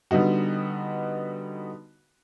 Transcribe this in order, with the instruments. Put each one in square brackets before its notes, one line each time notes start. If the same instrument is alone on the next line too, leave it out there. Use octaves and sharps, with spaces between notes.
[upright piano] D3 G3 B3 D#4 F#4